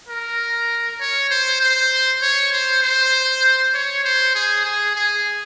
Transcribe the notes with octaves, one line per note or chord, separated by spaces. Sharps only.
A#4
C#5
C5
C5
C#5
C5
C5
C#5
C5
G#4
G#4
G#4